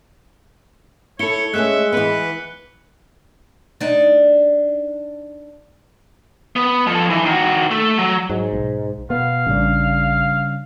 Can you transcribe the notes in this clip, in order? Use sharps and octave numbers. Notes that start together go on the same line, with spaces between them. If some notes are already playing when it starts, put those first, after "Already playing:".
E4 A4 C#5 C#7 G7
G#3 A3 B3 C#4 E5 F#6 C#7
E3 B3 B4
D4 D#4
B3
F3 A4
E3
D#3 F#4
A3
F#3
G#2 F#3
B1
B2 B3 F5
A1 C#3 G3 D4